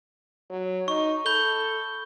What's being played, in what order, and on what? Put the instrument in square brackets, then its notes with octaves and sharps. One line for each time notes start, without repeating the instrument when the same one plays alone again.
[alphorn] F#3
[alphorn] D#4 [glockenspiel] C#6
[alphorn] A4 [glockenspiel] B5 G6 G7